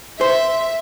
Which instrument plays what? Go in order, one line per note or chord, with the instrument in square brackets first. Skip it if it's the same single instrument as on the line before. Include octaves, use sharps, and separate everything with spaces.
[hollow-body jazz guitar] C5 [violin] E5